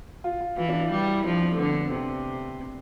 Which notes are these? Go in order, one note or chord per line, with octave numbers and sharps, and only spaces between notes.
F4
F4
E3 F4
D4
E4
G3 E4
E4
F3 D4
C4
A3
D3 B3
C4
C4
C3 D4